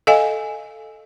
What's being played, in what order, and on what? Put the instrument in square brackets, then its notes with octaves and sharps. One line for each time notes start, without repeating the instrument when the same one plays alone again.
[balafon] A4 D#5 F5 G#5